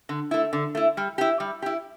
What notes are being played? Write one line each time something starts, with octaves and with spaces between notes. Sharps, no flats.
D3
A3 E4
D3
A3 E4
G3
E4 G4
G3
E4 G4